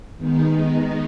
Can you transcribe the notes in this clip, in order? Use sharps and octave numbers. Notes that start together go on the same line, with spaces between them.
D#3 G#3 B3 D#4